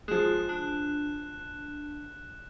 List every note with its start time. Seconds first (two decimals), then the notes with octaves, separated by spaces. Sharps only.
0.08 F3 G#3 G#4 F#6 E7
0.49 D4